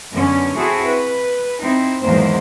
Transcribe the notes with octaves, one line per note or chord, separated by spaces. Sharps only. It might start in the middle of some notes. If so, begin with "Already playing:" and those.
F#2 D3 B3 C#4
C4 E4 F#4 G#4 A4
B4
C4 D#4 E4
E2 G#2 D#3 F#3 A#3 C5